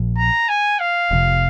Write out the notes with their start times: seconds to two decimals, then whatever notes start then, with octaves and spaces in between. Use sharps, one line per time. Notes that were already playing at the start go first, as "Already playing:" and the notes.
Already playing: A#1 A#2 F3
0.17 A#5
0.48 G#5
0.79 F5
1.11 F1 F2 C3